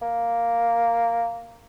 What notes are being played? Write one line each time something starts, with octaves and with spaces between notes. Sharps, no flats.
A#3